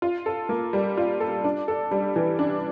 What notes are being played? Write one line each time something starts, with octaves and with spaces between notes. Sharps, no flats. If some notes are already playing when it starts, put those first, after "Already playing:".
F4
A4
A#3
G3
F4
A4
D4
A4
G3
E3
D4